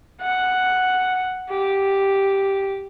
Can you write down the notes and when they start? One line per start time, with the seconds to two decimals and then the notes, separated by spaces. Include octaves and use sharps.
0.22 F#5
1.50 G4